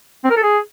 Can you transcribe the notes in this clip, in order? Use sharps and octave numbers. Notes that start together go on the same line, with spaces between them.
C4
A#4
A4
G#4